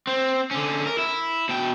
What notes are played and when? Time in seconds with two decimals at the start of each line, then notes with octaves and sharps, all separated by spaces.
0.07 C4
0.51 D3 C#4
0.86 A#4
0.98 E4
1.49 B2 G5